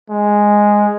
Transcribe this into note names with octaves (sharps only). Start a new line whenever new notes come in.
G#3